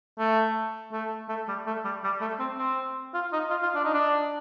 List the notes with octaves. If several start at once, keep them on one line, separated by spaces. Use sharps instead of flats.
A3
A3
A3
G3
A3
G3
G3
A3
C4
C4
F4
D#4
F4
F4
D4
D#4
D4